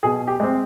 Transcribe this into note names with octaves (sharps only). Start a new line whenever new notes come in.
B2 G#4
G4
G#3 C4